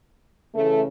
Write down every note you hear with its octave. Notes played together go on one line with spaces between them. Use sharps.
C#3 E3 A3